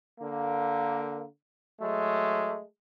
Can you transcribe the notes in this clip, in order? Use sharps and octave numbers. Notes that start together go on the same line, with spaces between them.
D3 A#3
F#3 G#3 A3